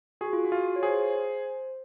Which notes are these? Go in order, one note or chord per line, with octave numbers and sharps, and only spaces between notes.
F#4 G#4
F4
F#4
F4
C#5
G#4 C5